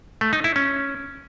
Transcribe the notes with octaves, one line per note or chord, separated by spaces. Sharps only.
A3
D#4
E4
C#4